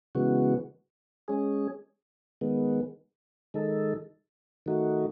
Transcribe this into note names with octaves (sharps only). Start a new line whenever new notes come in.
C#3 E3 G#3 B3 F#4
G#3 C#4 G#4
D#3 G#3 B3
D#3 G#3 D#4 A4
D#3 A3 D#4 F#4